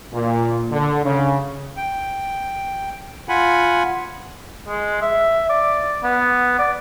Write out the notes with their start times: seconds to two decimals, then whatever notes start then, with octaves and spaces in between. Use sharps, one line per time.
0.11 A#2
0.70 D3
1.04 C#3
1.77 G5
3.29 F4 F#5 G#5 B5
4.68 G#3
5.01 E5
5.49 D5
6.03 B3
6.59 D5